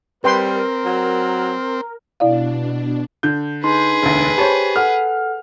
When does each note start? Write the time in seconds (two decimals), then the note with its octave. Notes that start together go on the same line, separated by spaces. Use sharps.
0.24 G3 C4 A#4 B4 G5 C6
0.85 F#3
2.20 B2 D4 E4 D5 F5
3.23 D3 G6
3.64 D#4 G#4 B4 C6
4.02 E1 D2
4.38 G4 C5 C#5 A5 B5
4.76 A4 F#5 F6